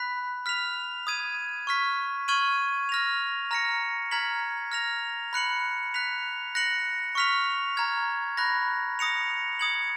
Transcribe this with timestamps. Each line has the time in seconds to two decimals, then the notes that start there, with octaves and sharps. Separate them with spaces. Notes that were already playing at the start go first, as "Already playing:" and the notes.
Already playing: B5 F#6 B6
0.46 F6 B6 F7
1.07 D#6 G#6 D#7
1.67 C#6 F6 B6
2.28 C#6 F6 G#6 D#7 F#7
2.89 F6 A#6 F7
3.51 A#5 F6 A#6 C#7
4.11 A#5 F6 G#6 B6 F#7
4.72 F6 A#6 F7
5.33 B5 F#6 C#7 F#7
5.94 F#6 B6 F7
6.55 F#6 A#6 C#7 F#7
7.15 C#6 F6 B6 F7
7.77 A#5 F6 G#6
8.37 B5 F#6 A#6
8.99 D#6 A#6 C#7 F7
9.59 D#6 G#6 C#7 F#7